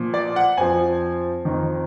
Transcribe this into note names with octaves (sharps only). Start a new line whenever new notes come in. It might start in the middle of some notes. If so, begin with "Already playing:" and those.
Already playing: A#2 F3
D5
F#5
F2 F3 G#5
F2 D#3